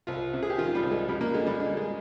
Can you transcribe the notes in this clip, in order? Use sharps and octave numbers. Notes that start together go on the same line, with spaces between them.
C2 F4
C3
G#4
G4
D#3 F4
G3
C2
G#3
F2 G3
A#3
D3 G#3
G3
D3 G#3
G#3